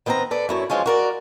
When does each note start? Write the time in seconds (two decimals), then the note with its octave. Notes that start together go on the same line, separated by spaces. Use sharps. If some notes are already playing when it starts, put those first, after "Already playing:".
0.06 D#3 B3 C4 F5 A#5
0.31 A4 B4 D5
0.49 F#2 E4 C#5
0.70 E3 F3 G#3 C#4 F4
0.86 F#4 A#4 D5